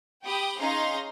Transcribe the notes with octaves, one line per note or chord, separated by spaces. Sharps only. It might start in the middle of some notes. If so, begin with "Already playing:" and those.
G4 G5 B5 D#6
C#4 D#4 G#4 F5 A#5 C6